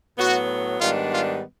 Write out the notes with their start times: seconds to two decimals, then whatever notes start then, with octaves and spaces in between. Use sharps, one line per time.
0.18 A2 F#3 B3 F#4
0.80 G#2 D#3 G3 B3 D4 F4
1.11 F4